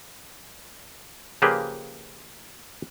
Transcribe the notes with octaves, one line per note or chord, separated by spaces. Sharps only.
C#3 F3 A#3 G4 G#4 B4